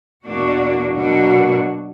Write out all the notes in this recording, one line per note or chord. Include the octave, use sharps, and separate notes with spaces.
E2 B2 A#3 D4 F#4
B2 F#3 A#3 D4 F#4